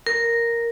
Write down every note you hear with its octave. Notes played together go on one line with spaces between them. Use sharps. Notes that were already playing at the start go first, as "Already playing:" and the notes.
A#4